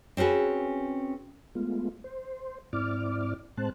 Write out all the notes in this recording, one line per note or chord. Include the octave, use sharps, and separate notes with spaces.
C4 C#4 F#4 G#4 B4
G#3 A3 B3 F4
C5
G#2 C4 E4 D5 D6 F6
A2 G#3 C4 C5 A5 F#6